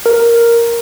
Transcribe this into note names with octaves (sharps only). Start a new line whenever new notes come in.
A#4